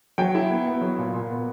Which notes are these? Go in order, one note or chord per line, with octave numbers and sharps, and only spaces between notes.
F#3 G5
E4
B3
B3
F#3
A#2
A#2
B3